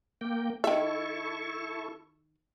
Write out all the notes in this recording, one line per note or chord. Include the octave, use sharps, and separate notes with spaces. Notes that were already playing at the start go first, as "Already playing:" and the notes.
A#3 G5
D#3 E4 A4 E5 C#6